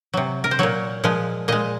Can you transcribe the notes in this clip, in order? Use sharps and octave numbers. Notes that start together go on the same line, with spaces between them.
C3 F#3
A#4
C5
A#2 F#3 C#5
A#2 F3 G#3
A#2 G#3 D#5